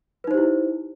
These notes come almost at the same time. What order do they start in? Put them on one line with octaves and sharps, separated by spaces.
B4 D#4 C5 G4 E4